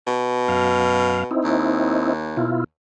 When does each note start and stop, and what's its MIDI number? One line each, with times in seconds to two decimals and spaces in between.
0.07 1.37 47
0.48 1.24 42
0.48 1.24 77
1.31 2.13 60
1.31 2.13 63
1.31 2.13 64
1.44 2.66 39
2.37 2.64 47
2.37 2.64 64
2.37 2.64 65